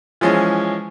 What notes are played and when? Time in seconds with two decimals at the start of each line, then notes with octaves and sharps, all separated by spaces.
0.21 E3 F3 G#3 C#4